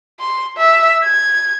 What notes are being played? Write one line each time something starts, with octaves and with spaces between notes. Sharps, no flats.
C6
E5
G#6